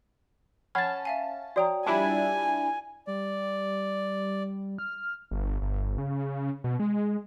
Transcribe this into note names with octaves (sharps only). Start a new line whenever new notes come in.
C#4 F#5 A5 B5 G#6 A6
E5 F5 G#5
F#4 C#5 D5 G5 A#5 D#6
G3 D4 E4 F4 G#5 A5
G3 D5
F6
G1
G1
C#3
B2
G#3